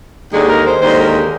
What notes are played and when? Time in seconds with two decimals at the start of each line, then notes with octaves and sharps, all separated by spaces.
0.31 D#2 D3 G#3 G#4
0.48 A#4
0.65 C5
0.81 D#2 D3 G#3 C5
0.99 A#4
1.15 G#4